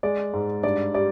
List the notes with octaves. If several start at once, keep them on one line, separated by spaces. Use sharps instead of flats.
G#3 D5
G#2
G2 D5
G3 D5